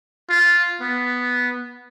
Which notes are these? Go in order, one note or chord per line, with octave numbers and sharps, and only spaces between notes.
F4
B3